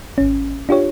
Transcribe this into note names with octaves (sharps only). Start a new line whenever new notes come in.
G#1 C#4
D4 F4 G4 C#5